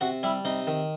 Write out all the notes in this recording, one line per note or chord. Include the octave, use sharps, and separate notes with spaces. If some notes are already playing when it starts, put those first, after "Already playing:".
C3 F#4
G3 E4
C3 D#4
D#3